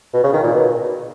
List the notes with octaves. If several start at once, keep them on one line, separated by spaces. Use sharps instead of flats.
B2
C#3
D#3
A#2
B2